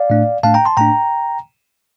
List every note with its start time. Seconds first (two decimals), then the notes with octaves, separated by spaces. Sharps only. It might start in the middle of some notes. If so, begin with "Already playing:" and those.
Already playing: D5 F5
0.10 A2 A3 D4
0.43 A2 A3 D4 F5 A5
0.54 G5 A#5
0.66 A5 C6
0.77 A2 A3 D4 G5 A#5